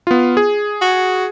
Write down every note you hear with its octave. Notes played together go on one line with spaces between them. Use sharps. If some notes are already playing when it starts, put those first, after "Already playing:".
B3 F4
G#4
F#4